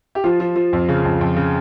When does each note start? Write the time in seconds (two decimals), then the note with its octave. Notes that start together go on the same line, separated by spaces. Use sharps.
0.15 G4
0.24 F3 F4
0.40 F3
0.56 F3
0.73 F2
0.88 C#3
1.05 F2
1.21 F2
1.36 C#3